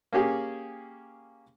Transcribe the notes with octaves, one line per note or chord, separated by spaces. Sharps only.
A#3 C#4 G4 G#4